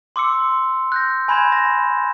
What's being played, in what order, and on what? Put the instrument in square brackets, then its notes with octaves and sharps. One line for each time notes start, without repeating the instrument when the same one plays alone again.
[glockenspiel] C6 D6 E6 C#7
F#6 G6 A#6
G#5 B5 C6 G#6 E7
A#6